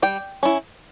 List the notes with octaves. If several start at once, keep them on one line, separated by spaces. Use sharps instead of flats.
G3 G5
C#4 E4